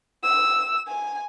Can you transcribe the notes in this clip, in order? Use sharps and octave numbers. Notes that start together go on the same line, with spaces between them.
E6
G#5